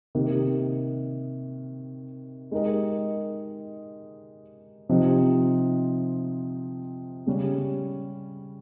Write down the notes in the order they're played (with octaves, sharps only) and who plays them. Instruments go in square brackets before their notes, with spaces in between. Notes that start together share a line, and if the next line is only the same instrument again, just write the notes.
[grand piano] C3 D#3 A#3
G#3 D#4 G4 A#4 D#5
C3 F3 C4 D#4
C#3 G3 C#4